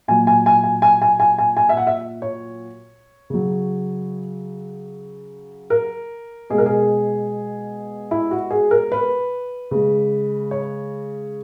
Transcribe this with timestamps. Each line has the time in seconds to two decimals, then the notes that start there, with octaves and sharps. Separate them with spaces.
0.08 A#2 F#3 G#5
0.27 G#5
0.46 G#5
0.63 G#5
0.82 G#5
1.02 G#5
1.20 G#5
1.38 G#5
1.57 G#5
1.69 E5
1.77 F#5
1.87 E5
2.22 C#5
3.30 C#3 F#3
5.70 A#4
6.50 B2 G#3 G#4
6.58 A#4
6.66 G#4
8.11 E4
8.31 F#4
8.50 G#4
8.71 A#4
8.92 B4
9.71 C#3 G#3
10.51 C#5